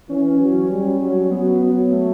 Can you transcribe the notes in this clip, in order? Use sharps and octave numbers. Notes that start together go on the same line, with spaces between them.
E3 C#4
F#3
G3
F#3
F#3 B3
F#3
A3